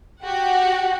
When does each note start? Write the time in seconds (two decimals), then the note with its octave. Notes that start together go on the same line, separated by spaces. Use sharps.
0.22 F#4 G4 F#5